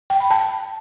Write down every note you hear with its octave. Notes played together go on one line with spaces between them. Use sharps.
G5
B5
A5